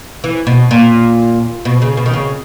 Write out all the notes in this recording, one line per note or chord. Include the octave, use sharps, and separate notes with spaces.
E3
B2
A#2
B2
C#3
B2
D#3
C#3